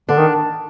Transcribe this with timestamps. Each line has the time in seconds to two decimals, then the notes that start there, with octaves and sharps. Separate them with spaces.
0.09 D3 D4
0.17 D#3